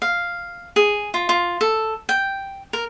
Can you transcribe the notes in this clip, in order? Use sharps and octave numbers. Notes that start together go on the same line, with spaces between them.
F5
G#4
F4
F4
A4
G5
A#4